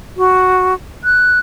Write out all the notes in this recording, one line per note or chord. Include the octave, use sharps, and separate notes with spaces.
F#4
F#6